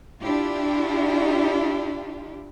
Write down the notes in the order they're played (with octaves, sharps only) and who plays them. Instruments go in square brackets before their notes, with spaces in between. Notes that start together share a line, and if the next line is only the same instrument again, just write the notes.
[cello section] D4 E4 F4 G4